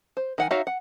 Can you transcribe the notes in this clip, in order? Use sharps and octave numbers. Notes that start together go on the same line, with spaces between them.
C5
D#3 F#5 G#5
D#4 F#4 C#5 E5 F5
F#5